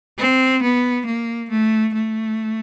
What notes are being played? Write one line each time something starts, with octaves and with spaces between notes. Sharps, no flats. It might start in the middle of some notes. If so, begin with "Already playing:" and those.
C4
B3
A#3
A3
A3